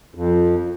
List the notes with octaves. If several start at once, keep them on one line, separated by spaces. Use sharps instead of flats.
F2